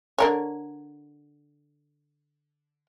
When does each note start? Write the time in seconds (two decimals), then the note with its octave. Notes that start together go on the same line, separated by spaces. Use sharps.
0.18 D3 A#4 C#5